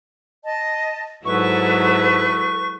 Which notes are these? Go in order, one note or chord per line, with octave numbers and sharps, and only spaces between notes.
D#5 A5
G#2 F#3 G#3 E4 A4 B4 C#6